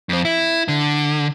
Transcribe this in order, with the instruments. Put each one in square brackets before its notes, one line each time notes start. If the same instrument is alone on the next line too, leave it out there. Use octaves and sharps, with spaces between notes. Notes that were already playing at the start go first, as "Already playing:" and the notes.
[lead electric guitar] F2 C4
E4
D3